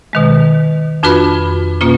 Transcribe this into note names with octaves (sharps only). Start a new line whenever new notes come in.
B2 D#3 G#3
F2 D4 F4 F#4 B4 B5
B2 A#3 C#4 F4